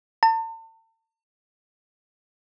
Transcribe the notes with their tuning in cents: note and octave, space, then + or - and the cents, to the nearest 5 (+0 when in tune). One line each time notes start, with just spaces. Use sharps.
A5 +40